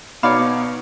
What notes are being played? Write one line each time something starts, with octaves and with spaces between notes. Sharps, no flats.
B2 B3 D#4 C#5 D5 F5 B5